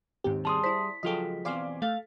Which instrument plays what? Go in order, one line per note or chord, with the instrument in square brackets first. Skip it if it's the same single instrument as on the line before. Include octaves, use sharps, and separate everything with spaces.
[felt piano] D#2 C4 [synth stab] G#2 G4
[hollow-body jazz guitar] G3 G#4 [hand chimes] A5 C6 D#6
[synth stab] E4 C5 [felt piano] D5 [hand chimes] B6
[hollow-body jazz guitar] C#2 F4 G5 [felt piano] F3 F#3 G#4 [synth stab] A4 D#5
[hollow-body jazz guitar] E2 B2 C4 [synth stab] D5 F5 C6 [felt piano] G#5 D6
[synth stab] A3 F6 A6 [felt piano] A4 [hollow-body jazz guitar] F5